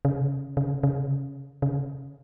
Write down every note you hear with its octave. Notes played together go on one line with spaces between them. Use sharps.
C#3
C#3
C#3
C#3